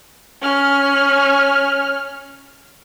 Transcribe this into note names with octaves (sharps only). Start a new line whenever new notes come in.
C#4 F6